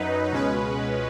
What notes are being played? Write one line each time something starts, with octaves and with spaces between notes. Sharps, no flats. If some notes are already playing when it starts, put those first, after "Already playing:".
Already playing: F#2 F#3 D#4 B4
C#2 B2 G#3 C#4 B4